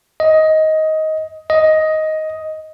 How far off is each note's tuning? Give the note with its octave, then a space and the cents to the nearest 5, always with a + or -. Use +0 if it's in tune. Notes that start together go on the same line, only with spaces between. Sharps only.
D#5 +15
D#5 +10